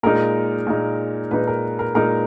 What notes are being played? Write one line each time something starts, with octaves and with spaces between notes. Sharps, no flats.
A#2 G#3 D#4 A#4
A#2 G#3 D#4
A#2 G#3 D#4 B4
A#4
A#4
A#2 G#3 D#4 A#4